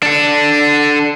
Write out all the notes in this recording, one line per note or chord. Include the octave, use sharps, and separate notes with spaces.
D4 A4